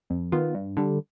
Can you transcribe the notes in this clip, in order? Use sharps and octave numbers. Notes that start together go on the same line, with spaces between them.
F2
D#3 B3 F4
G2
D3 G3